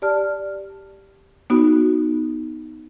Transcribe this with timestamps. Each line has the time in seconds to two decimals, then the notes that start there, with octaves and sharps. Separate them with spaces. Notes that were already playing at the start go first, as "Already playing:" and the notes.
0.02 G4 D5 A5 F6
1.50 B3 D#4 F#4